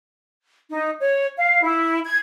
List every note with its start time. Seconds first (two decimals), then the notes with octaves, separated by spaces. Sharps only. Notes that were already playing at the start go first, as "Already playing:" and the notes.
0.69 D#4
0.99 C#5
1.37 F5
1.62 E4
2.05 G#6